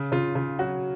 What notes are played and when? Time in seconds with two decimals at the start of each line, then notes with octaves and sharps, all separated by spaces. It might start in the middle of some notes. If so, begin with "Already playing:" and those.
Already playing: C#3
0.12 C#3 F4
0.35 C#3 F4
0.59 F#3 F#4